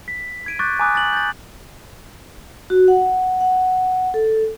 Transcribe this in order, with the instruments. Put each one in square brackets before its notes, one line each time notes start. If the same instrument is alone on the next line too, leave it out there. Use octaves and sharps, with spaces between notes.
[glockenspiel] B6
G#6 D7 D#7
C#6 D6 F#6 G6 A6
G#5 A#5 D6 D#6 F#6
A6 F#7
G6 A6
[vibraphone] F#4
F#5
F#5
A4